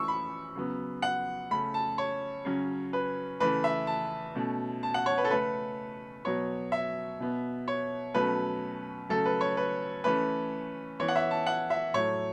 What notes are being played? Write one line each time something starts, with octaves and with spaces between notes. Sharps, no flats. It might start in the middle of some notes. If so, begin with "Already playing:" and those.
Already playing: E3 A3 C#4 C#6 E6
B5
C#3 F#3 B3
F#5
C#3 A3 C#4 B5
A5
C#5
C#3 F#3 C#4
B4
C#3 E3 A3 B4
E5
A5
B2 A3 C#4
A5
F#5
C#5
B4
A4
C#3 A3 C#4 B4
B2 F#3 B3 C#5
E5
B2 B3
C#5
B2 F#3 A3 C#4 B4
C#3 F#3 A3 C#4 A4
B4
C#5
B4
E3 A3 C#4 B4
E3 B3 C#5
F#5
E5
A5
F#5
E5
A2 F#3 A3 C#5